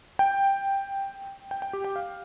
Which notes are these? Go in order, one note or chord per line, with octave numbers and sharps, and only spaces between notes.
G5
G5
G5
G4
G5
F5